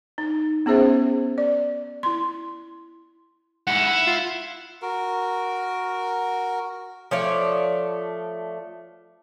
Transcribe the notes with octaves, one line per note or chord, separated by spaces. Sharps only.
D#4
B3 C#4 G#4 C5 E5
D5
E4 C6
G#2 E4 F#5
E4
F4
F#4 A#4
F3 A3 C#5 D5